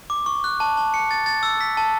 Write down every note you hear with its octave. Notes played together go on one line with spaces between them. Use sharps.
D6
C#6
F#6
A5
A5
C#7
A6
A6
E6
B6
A5